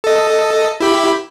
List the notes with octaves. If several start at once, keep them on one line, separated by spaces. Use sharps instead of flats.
A4 D#5
E4 G4 B5